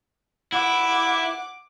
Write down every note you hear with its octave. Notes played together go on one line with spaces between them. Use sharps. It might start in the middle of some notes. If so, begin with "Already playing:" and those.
E4 F#5 D6